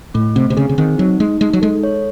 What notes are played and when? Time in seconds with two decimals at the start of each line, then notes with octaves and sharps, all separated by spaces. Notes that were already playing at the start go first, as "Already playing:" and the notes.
0.14 A2 A3
0.36 C3 C4
0.50 C3
0.57 C#3 G#4
0.69 C#3
0.78 D#3 C4
0.98 F#3 D#4
1.20 G#3 D#4
1.41 G#3 D#4
1.53 F#3
1.62 G#3 A4
1.83 C#5